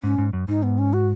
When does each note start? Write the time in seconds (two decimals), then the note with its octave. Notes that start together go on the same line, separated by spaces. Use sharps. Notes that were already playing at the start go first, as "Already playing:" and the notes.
0.03 G#2 C#4
0.18 G#2
0.33 F#2
0.48 G#2 D#4
0.63 B3
0.79 C#4
0.93 F#4